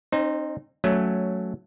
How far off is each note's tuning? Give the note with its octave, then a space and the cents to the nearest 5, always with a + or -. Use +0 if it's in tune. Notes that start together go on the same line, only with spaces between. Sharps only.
C4 +45 D#4 -20 C5 +5
F#3 +0 A3 +0 C#4 +10